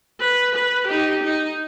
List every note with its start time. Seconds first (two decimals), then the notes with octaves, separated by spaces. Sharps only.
0.20 B4
0.54 B4
0.87 D#4 G4
1.23 D#4